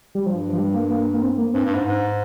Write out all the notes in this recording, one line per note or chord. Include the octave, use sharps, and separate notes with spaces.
G3
G2 F3
F3
G3
A#3
A#3
A#3
C4
A#3
G2 C4
G2
G#2
G#2